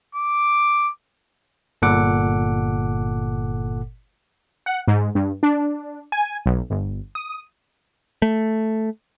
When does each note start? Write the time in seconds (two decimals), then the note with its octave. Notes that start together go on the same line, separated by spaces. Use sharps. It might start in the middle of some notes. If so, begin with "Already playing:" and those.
0.15 D6
1.82 G1 A#2 A4 F#5 D6
4.66 F#5
4.88 G#2
5.15 G2
5.43 D4
6.12 G#5
6.46 B1
6.70 G1
7.15 D#6
8.22 A3